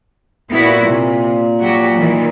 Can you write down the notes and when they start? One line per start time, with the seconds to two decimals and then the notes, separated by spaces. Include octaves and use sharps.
0.51 A#2 B3 E4 F#4
0.84 C3
1.63 F#3 F#4 G4
2.00 D#3 E3